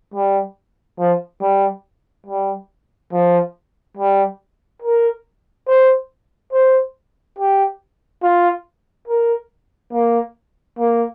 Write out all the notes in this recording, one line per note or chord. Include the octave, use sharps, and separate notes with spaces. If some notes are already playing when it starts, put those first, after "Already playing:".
G3
F3
G3
G3
F3
G3
A#4
C5
C5
G4
F4
A#4
A#3
A#3